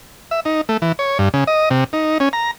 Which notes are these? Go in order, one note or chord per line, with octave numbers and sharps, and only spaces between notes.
E5
D#4
A3
E3
C#5
G2
C#3
D#5
C3
D#4
C#4
A#5